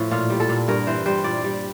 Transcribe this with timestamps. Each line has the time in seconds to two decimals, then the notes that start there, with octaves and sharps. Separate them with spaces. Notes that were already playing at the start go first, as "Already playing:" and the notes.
Already playing: A2 F3
0.11 A#2 F4
0.30 G3
0.40 A4
0.49 A#2
0.68 G2 A#4
0.87 E3 C5
1.06 G3 C5
1.24 A#2 D5
1.44 G3